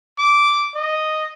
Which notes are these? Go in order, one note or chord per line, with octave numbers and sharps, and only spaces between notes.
D6
D#5